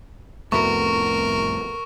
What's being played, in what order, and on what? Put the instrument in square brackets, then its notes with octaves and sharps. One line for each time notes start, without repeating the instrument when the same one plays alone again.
[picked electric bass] C2 F2 A2 [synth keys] A3 B3 F#4 [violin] A#4 [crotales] C#6